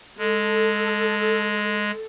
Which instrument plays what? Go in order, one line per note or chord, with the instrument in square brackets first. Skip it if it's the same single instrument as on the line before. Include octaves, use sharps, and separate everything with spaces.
[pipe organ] G#3 [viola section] A4